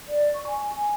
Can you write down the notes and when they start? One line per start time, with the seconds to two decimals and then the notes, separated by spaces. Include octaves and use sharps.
0.08 D5
0.34 C#6
0.47 G#5
0.76 G#5